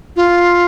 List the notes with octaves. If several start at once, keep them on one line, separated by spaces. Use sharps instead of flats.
F4